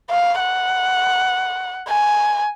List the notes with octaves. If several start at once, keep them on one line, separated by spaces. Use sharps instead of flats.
F5
F#5
G#5